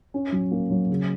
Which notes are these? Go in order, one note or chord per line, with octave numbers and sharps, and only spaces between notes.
C#4
F#3
A#3
F#3
C#3